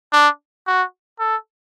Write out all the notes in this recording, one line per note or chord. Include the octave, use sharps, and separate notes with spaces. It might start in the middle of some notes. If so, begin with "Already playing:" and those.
D4
F#4
A4